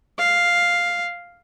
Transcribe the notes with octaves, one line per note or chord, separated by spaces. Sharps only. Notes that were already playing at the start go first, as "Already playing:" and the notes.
F5